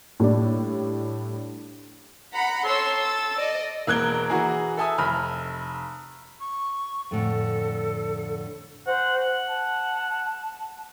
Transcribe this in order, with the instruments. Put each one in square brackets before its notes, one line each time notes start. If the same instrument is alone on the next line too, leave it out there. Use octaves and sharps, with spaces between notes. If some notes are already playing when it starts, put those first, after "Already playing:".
[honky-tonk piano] A2 G3 D4
[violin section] F#5 A#5 B5
[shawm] A4 [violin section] C#5 C6 E6
[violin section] E6 A6
D5 D#5
[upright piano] E1 A#3 F#6 G#6 G7
E3 F#4 G#4 A#5
A4 E5 G#5 D#6 E6
F1 B5 F6
[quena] C#6
[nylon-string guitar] F2 A2 D3 [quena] A4
[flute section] C5 G#5 [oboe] F#5
[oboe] F#5
[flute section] A5